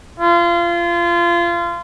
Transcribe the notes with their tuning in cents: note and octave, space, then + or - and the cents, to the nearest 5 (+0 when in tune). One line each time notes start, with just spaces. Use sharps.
F4 -25